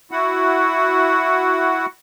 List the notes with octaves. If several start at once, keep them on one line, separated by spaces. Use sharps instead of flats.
E4 F#4 F#5